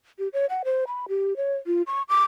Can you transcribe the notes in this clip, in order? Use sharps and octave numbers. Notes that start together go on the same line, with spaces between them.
G4
C#5
F#5
C5
B5
G4
C#5
F4
C#6
D6